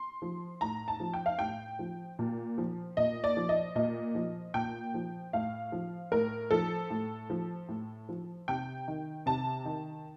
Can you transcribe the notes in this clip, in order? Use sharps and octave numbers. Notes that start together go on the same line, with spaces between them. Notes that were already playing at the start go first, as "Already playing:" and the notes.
Already playing: C6
F3
A2 A#5
A5
F3
G5
F5
A2 G5
F3
A#2
F3
A#2 D#5
D5
F3
D#5
A#2 D#5
F3
A#2 G5
F3
A2 F5
F3
A2 A#4
F3 A4
A2
F3
A2
F3
C3 G5
D#3
C3 A5
D#3